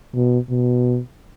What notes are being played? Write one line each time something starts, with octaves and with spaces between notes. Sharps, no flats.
B2
B2